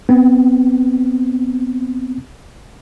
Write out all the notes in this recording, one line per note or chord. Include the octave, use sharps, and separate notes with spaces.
B3 C4